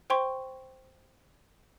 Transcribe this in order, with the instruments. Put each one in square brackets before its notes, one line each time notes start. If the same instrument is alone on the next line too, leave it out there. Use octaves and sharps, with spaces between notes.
[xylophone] C5 G5 C6 C#6